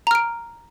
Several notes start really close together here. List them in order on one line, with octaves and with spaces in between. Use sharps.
A#5 F6 D7